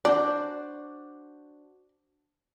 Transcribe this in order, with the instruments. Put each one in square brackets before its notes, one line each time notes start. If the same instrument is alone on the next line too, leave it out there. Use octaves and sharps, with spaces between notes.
[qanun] D4 F#4 C5 [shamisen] D5